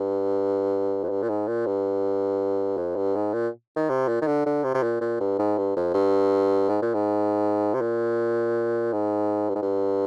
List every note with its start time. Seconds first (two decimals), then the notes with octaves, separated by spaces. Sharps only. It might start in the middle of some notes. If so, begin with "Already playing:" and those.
Already playing: G2
1.03 F2
1.09 G2
1.22 A#2
1.29 G#2
1.48 A#2
1.66 G2
2.77 F2
2.96 G2
3.15 G#2
3.33 A#2
3.76 D#3
3.89 C3
4.08 A#2
4.21 D#3
4.27 D3
4.46 D3
4.64 C3
4.74 C3
4.83 A#2
5.01 A#2
5.20 G2
5.39 G#2
5.57 G2
5.76 F2
5.94 G2
6.69 G#2
6.82 A#2
6.94 G#2
7.74 C3
7.81 A#2
8.92 G#2
9.49 G2
9.55 G#2
9.62 G2